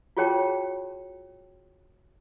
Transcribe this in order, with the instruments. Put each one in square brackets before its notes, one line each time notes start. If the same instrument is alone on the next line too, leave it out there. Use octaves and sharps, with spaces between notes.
[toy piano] F4 F#4 G#4 C#5 G5 A5